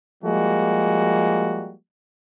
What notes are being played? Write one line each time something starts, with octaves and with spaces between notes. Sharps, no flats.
F3 G3 G#3 A#3 F#4